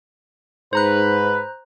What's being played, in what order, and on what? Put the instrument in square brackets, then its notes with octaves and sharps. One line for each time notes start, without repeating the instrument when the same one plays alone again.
[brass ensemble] G#2 B4 [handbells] C5 A#5 F#6